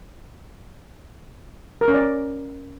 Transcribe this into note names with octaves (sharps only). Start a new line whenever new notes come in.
A#4
C#4
D5